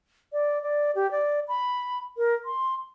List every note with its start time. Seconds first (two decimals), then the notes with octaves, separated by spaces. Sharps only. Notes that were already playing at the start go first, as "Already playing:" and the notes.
0.33 D5
0.63 D5
0.95 G4
1.11 D5
1.48 B5
2.17 A#4
2.45 C6